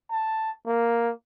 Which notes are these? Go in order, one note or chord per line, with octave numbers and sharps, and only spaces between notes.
A5
A#3